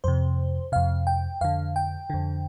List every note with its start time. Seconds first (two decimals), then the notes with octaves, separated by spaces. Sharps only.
0.04 F2 C3 C5
0.72 F2 C3 F5
1.07 G5
1.41 F2 D3 F5
1.76 G5
2.10 F2 D3